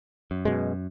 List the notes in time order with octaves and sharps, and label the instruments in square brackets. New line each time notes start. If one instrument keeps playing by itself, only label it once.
[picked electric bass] F#2
[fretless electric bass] B2 G#3